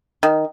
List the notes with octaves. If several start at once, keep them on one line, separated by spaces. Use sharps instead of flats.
D#3